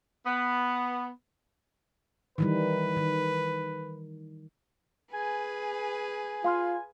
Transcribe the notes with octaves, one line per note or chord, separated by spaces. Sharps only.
B3
D#3 E3 G3 B4
D#3
G#4 B4 G#5
F4 F5 C6 F6